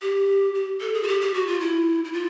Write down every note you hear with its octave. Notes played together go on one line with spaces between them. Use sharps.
G4
G4
A4
G#4
F#4
G4
G4
F#4
F4
E4
E4
F4